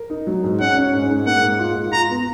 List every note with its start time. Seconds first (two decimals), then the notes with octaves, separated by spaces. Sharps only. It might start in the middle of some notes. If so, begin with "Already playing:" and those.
Already playing: A#4
0.10 D#4
0.27 F#3
0.43 G#2
0.60 C#4 F#5
0.77 C#4
0.93 G#2
1.10 G#2
1.26 A#3 F#5
1.42 G#2
1.59 F4
1.75 F4
1.92 F4 A#5
2.10 B3